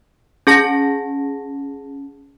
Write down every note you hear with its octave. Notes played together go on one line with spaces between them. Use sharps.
C#4 G#4 A5 A#6